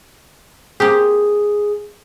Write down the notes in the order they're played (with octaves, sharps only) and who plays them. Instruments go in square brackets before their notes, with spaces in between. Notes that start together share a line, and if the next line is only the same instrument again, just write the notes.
[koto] A#3 C4 G4 [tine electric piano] G#4